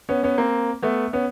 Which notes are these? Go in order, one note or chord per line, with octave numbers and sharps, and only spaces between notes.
B3 C#4
B3 C#4
A#3 C4
A3 B3
B3 C#4